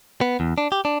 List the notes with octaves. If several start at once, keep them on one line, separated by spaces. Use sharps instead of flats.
B3
E2
D4
G4
D4